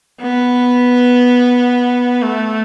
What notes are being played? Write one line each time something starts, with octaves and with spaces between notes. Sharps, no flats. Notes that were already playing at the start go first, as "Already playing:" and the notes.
B3
A3